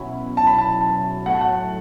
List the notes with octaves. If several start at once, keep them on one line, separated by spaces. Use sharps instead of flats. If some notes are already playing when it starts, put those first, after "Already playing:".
Already playing: B2 F#3 C#4 E4 B5
A5
B5
A5
A5
A2 F#3 A3 F#5
A5
F#5